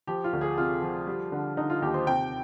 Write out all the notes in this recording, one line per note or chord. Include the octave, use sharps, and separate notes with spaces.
F3 G4
F4
D2
G#4
C3 F4
F3
G3
D3
D3 D#4
F4
D#2 G4
C5
C3 G5